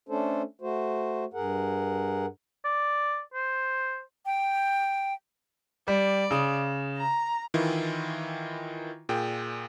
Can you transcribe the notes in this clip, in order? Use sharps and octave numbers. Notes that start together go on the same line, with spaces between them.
A3 C#4 D4 A4 C5
A3 F#4 C5
G2 G#4 A#4 F#5
D5
C5
G5
G3 D5
C#3 D#6
A#5
D#3 E3 E4 F4
A#2 G#4 G5